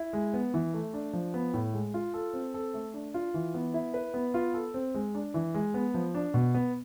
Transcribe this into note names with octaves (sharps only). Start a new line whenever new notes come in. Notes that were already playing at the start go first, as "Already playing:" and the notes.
Already playing: E4
G#3
B3
E3
A3
D4
F3
B3
A2
G#3
F4
A4
C4
A4
A3
D4
F4
E3
B3
E4
B4
B3
F4
A4
C4
G#3
D4
E3
G#3
B3
F3
D4
B2
B3